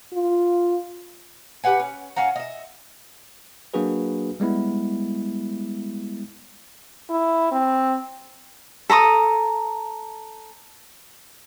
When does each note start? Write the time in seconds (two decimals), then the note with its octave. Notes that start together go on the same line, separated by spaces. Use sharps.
0.13 F4
1.64 G4 B4 F#5 G#5
1.80 C#4
2.16 C#4 F4 F#5 A#5
2.36 D#5 E5
3.74 F#3 A#3 D4 F#4 G#4 B4
4.40 G3 G#3 B3 E4
7.10 E4
7.52 C4
8.90 A4 A#5 C#6 D#6